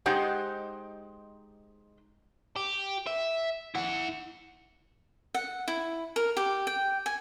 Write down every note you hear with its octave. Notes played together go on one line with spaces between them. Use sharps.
G#3 D#4 G4 C5 F#5
G4
E5
E4 F#5
F#5
E4
A#4
G4
G5
G#5